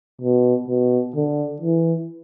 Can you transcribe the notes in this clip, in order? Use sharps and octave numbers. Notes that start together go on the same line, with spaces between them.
B2
B2
D3
E3